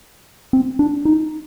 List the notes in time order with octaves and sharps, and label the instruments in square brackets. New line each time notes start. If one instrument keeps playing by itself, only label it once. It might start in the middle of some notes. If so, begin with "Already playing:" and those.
[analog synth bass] C4
D4
D#4